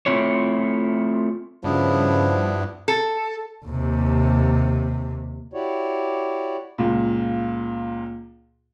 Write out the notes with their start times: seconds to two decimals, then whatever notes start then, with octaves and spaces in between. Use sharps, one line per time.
0.06 A3 C4 E4 F4 C#5
1.64 G2 C#3 F3 B3 D4 E4
2.88 A4
3.65 D#2 C3
5.53 E4 F#4 G4 C#5 D5
6.78 C#2 A#2